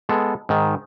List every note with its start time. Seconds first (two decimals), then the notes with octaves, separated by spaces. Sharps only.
0.09 G#3 B3 A4
0.49 G#2 D#3